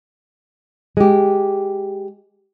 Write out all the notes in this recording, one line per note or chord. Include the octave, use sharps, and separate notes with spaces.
G#3 G4